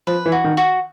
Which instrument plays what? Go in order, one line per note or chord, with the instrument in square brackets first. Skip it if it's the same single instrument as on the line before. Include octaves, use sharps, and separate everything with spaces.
[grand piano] F3 [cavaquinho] B4
[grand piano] E3
[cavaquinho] F#4
[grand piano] D#3
[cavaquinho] F#4